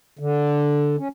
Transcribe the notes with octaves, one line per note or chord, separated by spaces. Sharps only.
D3
C#4